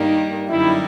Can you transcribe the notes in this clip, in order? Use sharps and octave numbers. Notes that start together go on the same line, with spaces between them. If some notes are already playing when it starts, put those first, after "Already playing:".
Already playing: G2 D#3 G3 A#3 D#4
F#2 D3 G3 A#3 D#4 E4